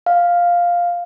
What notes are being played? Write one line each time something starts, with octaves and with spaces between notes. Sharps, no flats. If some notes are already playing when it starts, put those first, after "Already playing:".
F5